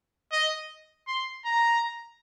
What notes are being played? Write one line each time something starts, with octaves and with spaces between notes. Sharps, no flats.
D#5
C6
A#5